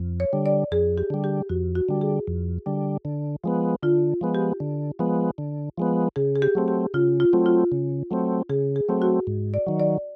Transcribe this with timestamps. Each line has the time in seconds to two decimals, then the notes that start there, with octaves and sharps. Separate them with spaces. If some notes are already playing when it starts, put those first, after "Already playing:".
Already playing: F2
0.20 C#5
0.33 D3 G3
0.46 D5
0.72 F2 G#4
0.98 G4
1.10 D3 G3
1.24 G4
1.49 F2 F#4
1.75 F#4
1.89 D3 G3
2.01 G#4
2.27 F2
2.66 D3 G3
3.05 D3
3.44 F3 G#3 B3
3.83 D3 F4
4.21 F3 G#3 B3
4.35 G4
4.60 D3
4.99 F3 G#3 B3
5.38 D3
5.78 F3 G#3 B3
6.16 C#3 G#4
6.36 G#4
6.42 G4
6.55 F#3 A3 C4
6.68 G4
6.94 C#3 F4
7.20 F4
7.33 F#3 A3 C4
7.46 F4
7.72 C#3
8.11 F#3 A3 C4
8.49 C#3 G#4
8.76 G#4
8.89 F#3 A3 C4
9.02 F#4
9.27 G#2
9.54 D5
9.67 D#3 F#3
9.80 D5